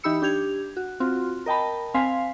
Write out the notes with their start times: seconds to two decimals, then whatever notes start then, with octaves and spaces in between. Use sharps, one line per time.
0.03 E3 D#4 G4 B5 E6 C#7
0.22 D4 G4 G6 G#6 F7
0.77 F#4
1.00 C4 F4 F#4
1.46 A#4 D#5 G5 A5 B5
1.94 C4 F5 G#5 B6 C7